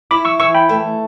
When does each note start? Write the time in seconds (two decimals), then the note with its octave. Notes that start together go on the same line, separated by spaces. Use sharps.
0.11 E4 B5 D6
0.25 C#6 E6
0.39 E3 C#6 E6
0.55 G5 B5
0.69 A3